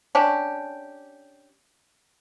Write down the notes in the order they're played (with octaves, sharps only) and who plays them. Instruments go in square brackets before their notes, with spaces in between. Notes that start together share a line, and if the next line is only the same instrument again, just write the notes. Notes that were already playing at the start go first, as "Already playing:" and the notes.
[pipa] C#4 D4 G4